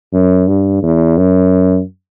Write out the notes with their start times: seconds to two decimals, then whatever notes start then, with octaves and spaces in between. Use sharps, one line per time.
0.13 F#2
0.48 G2
0.83 E2
1.18 F#2